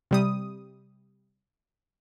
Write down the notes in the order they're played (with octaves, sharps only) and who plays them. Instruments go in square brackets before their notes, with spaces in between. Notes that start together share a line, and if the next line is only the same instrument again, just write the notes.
[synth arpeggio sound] C3 G3 D#6